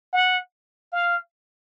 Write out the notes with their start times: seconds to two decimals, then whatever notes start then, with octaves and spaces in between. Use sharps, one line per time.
0.13 F#5
0.92 F5